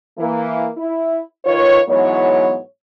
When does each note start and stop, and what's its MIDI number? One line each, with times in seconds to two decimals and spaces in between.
0.18 0.68 52
0.18 0.68 58
0.77 1.21 64
1.45 1.79 51
1.45 1.79 65
1.45 1.79 71
1.45 1.79 73
1.88 2.59 44
1.88 2.59 52
1.88 2.59 54
1.88 2.59 59
1.88 2.59 73